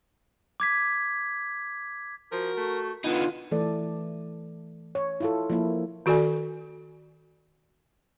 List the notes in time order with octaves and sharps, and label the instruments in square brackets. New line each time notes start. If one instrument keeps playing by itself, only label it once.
[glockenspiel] D6 G#6 B6
[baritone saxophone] F3 [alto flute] F#4 [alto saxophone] A#4
[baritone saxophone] A3
[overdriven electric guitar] D3 D#4 [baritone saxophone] E3 [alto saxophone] B3 [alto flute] F4
[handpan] E3 A3 A4 D5
C#5
E4 F4 A4
F3 A#3 E4
[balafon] D#3 F#4 A4 D5 G#5